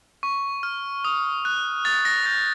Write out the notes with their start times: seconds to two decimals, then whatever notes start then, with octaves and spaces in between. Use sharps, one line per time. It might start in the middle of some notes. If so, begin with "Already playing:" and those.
0.23 C#6
0.63 F6
1.05 D#6
1.45 F#6
1.85 D#6 A6
2.05 A#6
2.26 G6 A#6